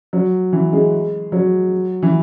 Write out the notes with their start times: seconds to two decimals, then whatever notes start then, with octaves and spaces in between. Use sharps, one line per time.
0.13 F#3
0.53 E3
0.72 G#3
1.32 F#3
2.03 E3